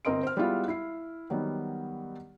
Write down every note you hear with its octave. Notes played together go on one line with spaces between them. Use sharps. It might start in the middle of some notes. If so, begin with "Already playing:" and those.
G1 C4 A#4 D#5 C6 D7
C5 F6
G3 G#3 B3 E4 F4
E4 C7
D#3 F#3 G3 B3